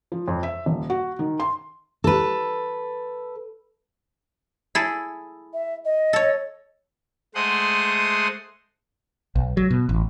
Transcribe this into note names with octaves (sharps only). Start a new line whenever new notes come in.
F3
F2
E5
D#1
F#4
D#3
C6
A4 B4
E4 G#4 A4
E5
D#5
A4 C#5
G#3 A3 C5 F#5 C6 D#6
B1
F#3
B2
A1